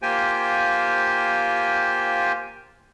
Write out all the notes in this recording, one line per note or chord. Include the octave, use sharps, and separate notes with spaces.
A#3 F4 G4 C5 G5 G#5